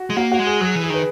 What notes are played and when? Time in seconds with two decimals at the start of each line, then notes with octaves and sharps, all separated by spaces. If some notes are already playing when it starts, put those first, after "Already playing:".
Already playing: F#4
0.10 G#3
0.16 A#3 F#4
0.32 F#4
0.39 G#3
0.47 G#4
0.61 F#3 G#4
0.76 E3
0.84 G#4
0.90 D#3 B4